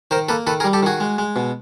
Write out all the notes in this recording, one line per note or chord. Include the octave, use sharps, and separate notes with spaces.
D#3 A#4 C5
A#3 A4 B4
D#3 A4 B4
G#4 A#4
G3
G4 A4
D#3 F#4 G#4
G#3
G#3
B2